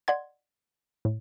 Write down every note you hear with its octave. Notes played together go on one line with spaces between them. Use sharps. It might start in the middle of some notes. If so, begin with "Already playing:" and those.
D5 D#5 F#5 C6 G#6
A2